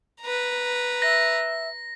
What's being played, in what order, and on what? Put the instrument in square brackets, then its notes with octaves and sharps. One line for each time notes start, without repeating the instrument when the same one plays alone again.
[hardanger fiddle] B4 A#5
[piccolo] E5 [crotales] A#6